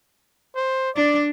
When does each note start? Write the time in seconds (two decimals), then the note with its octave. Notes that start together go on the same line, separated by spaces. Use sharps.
0.56 C5
0.96 D4 D5